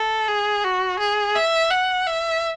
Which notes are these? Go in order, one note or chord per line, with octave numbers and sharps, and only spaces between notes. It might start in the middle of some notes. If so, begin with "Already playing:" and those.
Already playing: A4
G#4
F#4
G#4
E5
F#5
E5